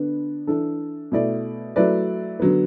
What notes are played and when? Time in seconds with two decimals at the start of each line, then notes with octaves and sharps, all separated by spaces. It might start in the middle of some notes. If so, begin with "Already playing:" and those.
Already playing: D3 B3 D4
0.47 E3 D4 A4
1.12 B2 A3 E4 D5
1.76 F#3 A3 E4 B4 D5
2.40 D3 F#3 B3